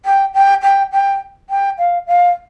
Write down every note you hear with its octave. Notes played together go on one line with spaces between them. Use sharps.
G5
G5
G5
G5
G5
F5
F5